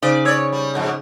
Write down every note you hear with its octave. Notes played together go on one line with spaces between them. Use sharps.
C#3 D#4 C5 D5
C#5 D5 E6 G#6
G3
F2 G#2 B2